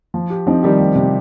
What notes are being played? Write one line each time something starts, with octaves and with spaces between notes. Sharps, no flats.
F3
G4
F3 C4 D#4
D#3 G3 G4
F3
C3